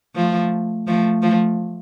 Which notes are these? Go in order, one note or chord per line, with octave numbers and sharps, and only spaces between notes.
F3 A3
F3 A3
F3 A3